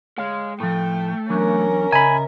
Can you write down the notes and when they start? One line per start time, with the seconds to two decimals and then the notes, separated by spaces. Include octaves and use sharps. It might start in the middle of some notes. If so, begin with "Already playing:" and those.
0.18 G#3 C#5 F5
0.60 A2 F3 A3 G5
1.30 E2 F#3 C#4 D4 A#4
1.92 C#3 D#5 E5 G#5 A#5 B5